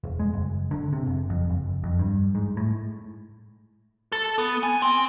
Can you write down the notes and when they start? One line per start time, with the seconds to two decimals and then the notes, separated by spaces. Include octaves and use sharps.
0.04 E1
0.19 G#3
0.34 F#1
0.71 D3
0.93 C3
1.06 F#1
1.30 F2
1.50 F#1
1.84 F2
1.99 G2
2.35 G#2
2.57 A2
4.12 A4
4.38 B3
4.63 G#5
4.82 C4